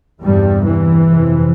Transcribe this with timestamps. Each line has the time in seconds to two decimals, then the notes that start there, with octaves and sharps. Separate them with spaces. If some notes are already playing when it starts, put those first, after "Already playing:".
0.23 E2 G2 C3 G3
0.64 E3
1.07 F2 C3